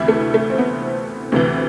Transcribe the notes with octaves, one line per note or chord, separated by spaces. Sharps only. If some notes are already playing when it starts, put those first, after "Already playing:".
Already playing: D2 C3 E3 E4
A3
A3
C4
B3
D2 C3 E3